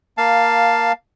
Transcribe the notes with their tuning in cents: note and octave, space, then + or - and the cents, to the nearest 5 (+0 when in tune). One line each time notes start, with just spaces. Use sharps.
A#3 +5 F5 +0 A5 +10